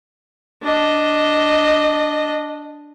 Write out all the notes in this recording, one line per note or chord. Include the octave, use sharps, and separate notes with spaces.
D4 D#5